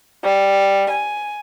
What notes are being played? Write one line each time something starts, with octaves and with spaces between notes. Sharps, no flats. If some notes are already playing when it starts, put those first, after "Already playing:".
G3
G#5